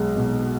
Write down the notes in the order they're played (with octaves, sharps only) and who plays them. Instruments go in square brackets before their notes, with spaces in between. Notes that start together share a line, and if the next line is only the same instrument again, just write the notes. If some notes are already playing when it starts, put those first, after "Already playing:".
Already playing: [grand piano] B1 G#3
B2